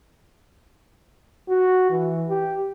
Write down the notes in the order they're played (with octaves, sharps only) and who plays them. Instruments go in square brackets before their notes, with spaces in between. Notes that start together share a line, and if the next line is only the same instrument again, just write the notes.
[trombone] F#4
E3
G4